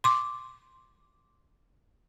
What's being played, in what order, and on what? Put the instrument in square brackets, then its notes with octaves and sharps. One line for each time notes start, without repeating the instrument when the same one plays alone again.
[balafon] C6 D6